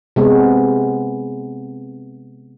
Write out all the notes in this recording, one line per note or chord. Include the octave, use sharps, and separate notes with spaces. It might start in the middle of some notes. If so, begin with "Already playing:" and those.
C3 G#3 B3